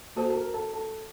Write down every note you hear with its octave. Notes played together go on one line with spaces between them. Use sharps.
A#3 F#4 A4 C5
A4
A#4
A4
A4